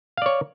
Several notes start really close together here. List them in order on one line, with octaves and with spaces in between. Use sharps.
F5 D5 C#5